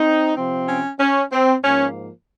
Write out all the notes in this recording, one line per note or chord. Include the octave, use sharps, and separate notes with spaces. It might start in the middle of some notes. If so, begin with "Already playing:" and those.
Already playing: C4 D#4
C3 F3 C4
C#4
C#4
C4
G#2 F3 A#3 C#4